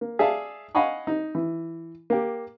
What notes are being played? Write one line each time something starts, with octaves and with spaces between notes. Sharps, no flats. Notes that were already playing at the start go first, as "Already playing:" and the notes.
A#3
G#4 D5 E5 F5 A5
D#5 F5 F#5 G#5 B5 C#6
D#4
E3
A#3 G4